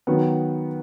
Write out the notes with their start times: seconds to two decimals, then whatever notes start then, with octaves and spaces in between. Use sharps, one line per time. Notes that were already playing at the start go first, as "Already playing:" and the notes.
0.07 D#3 F#3 B3